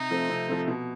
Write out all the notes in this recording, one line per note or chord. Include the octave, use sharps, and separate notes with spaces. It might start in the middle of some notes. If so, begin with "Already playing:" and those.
Already playing: C3 D#4
F3 A3 C4
C3
F3 A3 C4
B2